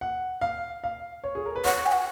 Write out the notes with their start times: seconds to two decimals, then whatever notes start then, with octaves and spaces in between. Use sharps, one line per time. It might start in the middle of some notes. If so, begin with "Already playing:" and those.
0.01 F#5
0.41 F5
0.84 F5
1.24 C#5
1.35 G#4
1.46 A#4
1.56 B4
1.65 C#5 F#5
1.86 G#5
1.92 F#5